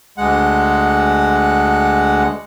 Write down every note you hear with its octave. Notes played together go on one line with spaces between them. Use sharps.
D2 G#3 F#5